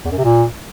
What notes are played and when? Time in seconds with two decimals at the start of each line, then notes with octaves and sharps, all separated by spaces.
0.05 E2
0.11 F#2
0.18 C3
0.24 A#2